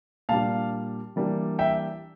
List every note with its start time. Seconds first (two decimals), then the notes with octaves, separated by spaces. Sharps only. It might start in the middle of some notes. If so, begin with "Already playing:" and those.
0.29 A#2 G3 D4 F5 A5
1.16 E3 G3 A#3 D4
1.59 E5 G5